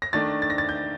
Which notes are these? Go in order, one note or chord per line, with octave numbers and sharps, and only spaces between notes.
A#6
D#3 A3 D4 A6
A6
A#6
A6
G6